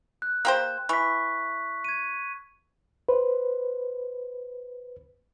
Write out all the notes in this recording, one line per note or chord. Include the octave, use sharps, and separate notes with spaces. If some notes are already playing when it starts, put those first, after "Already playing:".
F#6
A#3 G4 C5
E3 C#6 B6
G#6 D#7
B4 C5